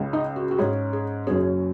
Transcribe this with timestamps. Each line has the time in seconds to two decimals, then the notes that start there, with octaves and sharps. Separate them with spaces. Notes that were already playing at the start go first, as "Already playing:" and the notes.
Already playing: C#2 C#3 G#3
0.13 D#4 D#5
0.36 F#4
0.51 F#4
0.58 G#2 G#3 C#4 G#4
0.93 G#4
1.27 F#1 F#2 F#3 C#4 G#4